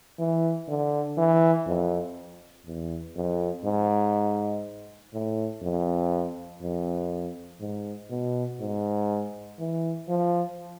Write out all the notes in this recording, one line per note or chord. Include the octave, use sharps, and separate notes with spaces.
E3
D3
E3
F2
E2
F2
G#2
A2
F2
F2
G#2
B2
G#2
E3
F3